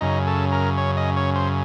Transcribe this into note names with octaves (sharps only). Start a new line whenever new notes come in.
F#2 C#3 D#4
A4
A#4
C#5
D#5
C#5
C5